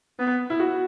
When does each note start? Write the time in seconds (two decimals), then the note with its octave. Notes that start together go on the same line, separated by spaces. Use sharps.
0.19 B3
0.50 E4
0.59 F#4